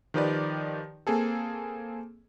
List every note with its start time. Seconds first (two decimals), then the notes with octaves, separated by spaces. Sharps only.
0.14 D#3 F3 D#4 G4 B4 D5
1.07 A#3 C4 G#4 A4